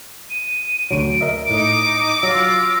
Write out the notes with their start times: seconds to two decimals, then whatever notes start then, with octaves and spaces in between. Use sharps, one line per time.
0.30 D#7
0.91 D2 F#3 D7
1.21 A#4 D#5 E5
1.50 A2 D#4 D6
2.23 F#3 F4 E6 A#6